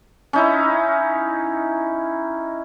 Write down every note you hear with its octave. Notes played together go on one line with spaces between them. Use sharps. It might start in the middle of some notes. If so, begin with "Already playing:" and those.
C#4 D#4 E4